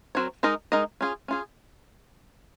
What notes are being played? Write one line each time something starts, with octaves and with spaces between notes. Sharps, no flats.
F#3 C4 F#4 A#4 C#5
G#3 D#4 A#4 D#5
G#3 D#4 A#4 D#5
C#4 F4 G#4
C#4 F4 G#4